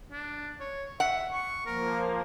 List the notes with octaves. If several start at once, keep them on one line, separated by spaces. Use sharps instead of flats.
D4
C#5
E5 F#5
C#6
F3 A#3 A#4